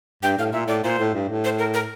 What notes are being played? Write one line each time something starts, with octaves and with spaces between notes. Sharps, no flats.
G2 G5
A2 F5
A#2 E5
A2 D5
A#2 C5
A2
G2
A2
C5
A#4
A#4